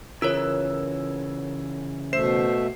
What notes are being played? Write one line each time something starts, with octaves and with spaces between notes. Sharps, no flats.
C#3 E3 F4 A#4 C#5 E6
B2 A3 C5 E5 C7 E7